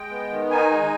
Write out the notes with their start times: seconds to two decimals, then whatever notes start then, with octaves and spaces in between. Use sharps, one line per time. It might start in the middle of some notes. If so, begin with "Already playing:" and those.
Already playing: G#3 G5
0.11 B3
0.30 D#3
0.51 D#4 G#5
0.71 G#3